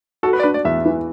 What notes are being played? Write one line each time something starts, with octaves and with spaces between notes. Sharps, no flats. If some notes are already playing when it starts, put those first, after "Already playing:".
F#4 A4
B4
D5
D4 B4
D5
E2 E5
E3